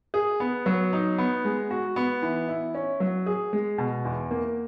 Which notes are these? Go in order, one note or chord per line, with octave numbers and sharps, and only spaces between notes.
G#4
B3
F#3
D#4
B3
G#3
F#4
B3
E3
E4
C#4
F#3
G#4
G#3
B2
E2
A#3